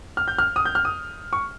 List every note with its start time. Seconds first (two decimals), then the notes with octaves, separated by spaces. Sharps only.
0.17 F6
0.28 G6
0.38 F6
0.56 D#6
0.65 G6
0.75 F6
0.85 D#6
1.33 C#6